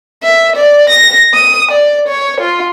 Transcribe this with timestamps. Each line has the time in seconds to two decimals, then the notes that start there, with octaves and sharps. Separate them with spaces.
0.24 E5
0.56 D5
0.90 A#6
1.34 D#6
1.72 D5
2.08 C#5
2.41 F4